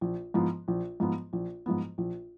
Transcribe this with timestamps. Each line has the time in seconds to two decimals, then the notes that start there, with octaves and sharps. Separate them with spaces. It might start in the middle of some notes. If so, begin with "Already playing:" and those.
0.01 A#1
0.34 G#2 F3 B3
0.68 A#1
1.00 G#2 F3 B3
1.33 A#1
1.66 G#2 F3 B3
1.98 A#1